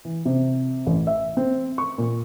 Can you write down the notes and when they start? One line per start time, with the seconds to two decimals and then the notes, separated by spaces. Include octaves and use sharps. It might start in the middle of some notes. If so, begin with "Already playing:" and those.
0.05 E3
0.25 C3
0.87 A1
1.07 E5
1.37 C4
1.78 C#6
1.98 A#2